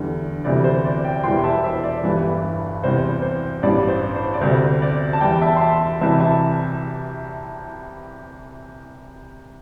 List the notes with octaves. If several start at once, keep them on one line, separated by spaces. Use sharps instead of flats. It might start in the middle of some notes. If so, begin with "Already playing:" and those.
Already playing: E2 D3 G3
D2 C3 E3 G3 D5
C5
D5
D5 G5
E1 E2 E3 G3 G5 C6
E5 A5
C5 E5
D5
G1 G2 E3 G3
E2 C3 G3 C5
C5
A1 G2 G3 D5
C5
C5
D5
D2 C3 G3 C5
D5
A5
E2 E3 G3 D5 G5
E5 A5
C6
E5 A5
C2 C3 E3 G3 E5 A5
E5 A5